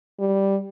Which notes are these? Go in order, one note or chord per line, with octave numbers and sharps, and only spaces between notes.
G3